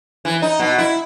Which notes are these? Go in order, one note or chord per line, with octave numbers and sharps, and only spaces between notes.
E3
D#4
B2
E4